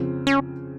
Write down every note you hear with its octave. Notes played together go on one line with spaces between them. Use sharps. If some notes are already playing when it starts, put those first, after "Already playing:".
Already playing: F2 C#3 F3 C4
C#4